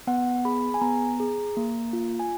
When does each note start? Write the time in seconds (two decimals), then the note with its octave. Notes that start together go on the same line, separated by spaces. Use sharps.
0.07 B3 F#5
0.45 G#4 B5
0.74 G#5
0.81 B3 A#5
1.20 G#4
1.57 A#3
1.93 F4
2.19 G#5